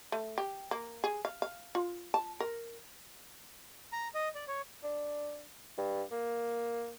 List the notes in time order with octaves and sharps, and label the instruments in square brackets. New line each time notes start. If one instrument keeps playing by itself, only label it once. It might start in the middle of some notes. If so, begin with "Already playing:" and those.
[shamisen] A3
G4
A#3
G#4
F5
F5
F4
A5
A#4
[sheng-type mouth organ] A#5
D#5
D5
C#5
[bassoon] D4
G2
A#3